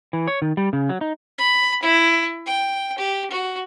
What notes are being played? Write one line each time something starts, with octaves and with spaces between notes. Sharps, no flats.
E3
C#5
D#3
G3
C#3
F#3
D#4
B5
E4
G5
G4
F#4